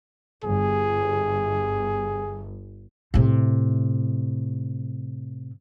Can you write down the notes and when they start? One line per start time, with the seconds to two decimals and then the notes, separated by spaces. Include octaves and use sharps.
0.44 G1 G#4
3.14 A2 C3